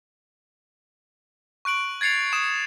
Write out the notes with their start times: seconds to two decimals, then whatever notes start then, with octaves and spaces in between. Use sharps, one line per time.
1.65 C#6 F#6 D7 F#7
2.01 G#6 A6 C7 C#7 F7
2.33 C#6 D#6 E7